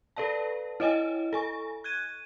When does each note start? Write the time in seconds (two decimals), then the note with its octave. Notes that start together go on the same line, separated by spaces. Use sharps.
0.16 A4 B4 D5 F5 A5
0.80 E4 C#5 D#5 G5 G#5
1.33 A4 G#5 C#6
1.84 F#6 G#6 D#7